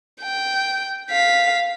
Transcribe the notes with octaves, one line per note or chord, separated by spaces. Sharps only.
G5
F5 B6